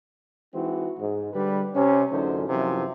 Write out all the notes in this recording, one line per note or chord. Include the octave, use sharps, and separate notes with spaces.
E3 G#3 C4 D#4 F#4
G#2
D3 G3 B4
C3 C#4
A1 F#2 D3 D#4 C5
F#2 C3 E3 F3